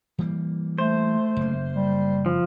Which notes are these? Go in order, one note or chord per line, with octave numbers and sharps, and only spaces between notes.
E3 G3 A#3
A3 C5
F#1 A#3
G3
F3